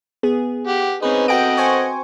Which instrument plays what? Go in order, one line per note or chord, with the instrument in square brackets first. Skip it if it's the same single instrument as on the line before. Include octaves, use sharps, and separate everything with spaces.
[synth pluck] B3 G#4
[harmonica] G4 F#5
[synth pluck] C4 B4 [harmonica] C#4 D#4 G#4
[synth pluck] F#4 G5 D7 [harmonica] A4 D#5 F#5
[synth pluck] C5 G#5 C#6